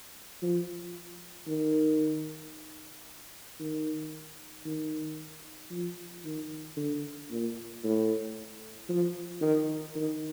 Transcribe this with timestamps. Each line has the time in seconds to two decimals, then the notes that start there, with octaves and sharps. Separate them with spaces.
0.42 F3
1.47 D#3
3.60 D#3
4.65 D#3
5.71 F3
6.25 D#3
6.77 D3
7.31 A#2
7.84 A2
8.89 F3
9.41 D#3
9.95 D#3